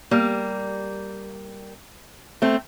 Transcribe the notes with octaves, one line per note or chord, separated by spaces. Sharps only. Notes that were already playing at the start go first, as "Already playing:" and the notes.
G3 A#3
A3 C4